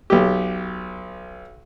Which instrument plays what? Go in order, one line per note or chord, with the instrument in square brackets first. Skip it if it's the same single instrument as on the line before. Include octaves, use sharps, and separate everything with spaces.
[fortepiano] B1 G4